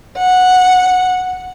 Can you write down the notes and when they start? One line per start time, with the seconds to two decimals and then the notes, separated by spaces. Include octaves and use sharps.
0.19 F#5